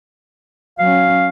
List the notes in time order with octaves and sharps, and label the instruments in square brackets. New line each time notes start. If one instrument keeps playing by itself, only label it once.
[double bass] F#3 C#4 [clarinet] F5